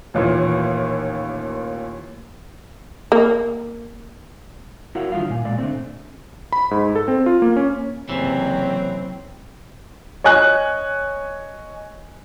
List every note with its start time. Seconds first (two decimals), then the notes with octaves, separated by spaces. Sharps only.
0.14 A1 D#2 A#2 E3
3.12 A#3
4.95 E4 F#4 A#4 C#5 F5 F#5
5.12 D3 D#3 G3 F4 F5
5.29 A#2 G#5
5.45 A#2 G#3 D5 F5
5.58 D3 A3 C4
6.52 B5
6.71 G#2
6.96 A4
7.08 C4
7.26 F4
7.42 A#3
7.57 C#4
8.09 F#1 C3 E3 F#3 C4
10.24 C#5 D#5 G#5 F#6